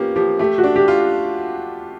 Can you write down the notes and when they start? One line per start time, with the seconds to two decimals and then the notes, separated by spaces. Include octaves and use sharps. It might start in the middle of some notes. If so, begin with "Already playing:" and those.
Already playing: A#3 B3 C#4 F4 G4
0.16 F3 G4
0.39 A3 G4
0.58 F#4
0.63 D4
0.76 G4
0.88 F4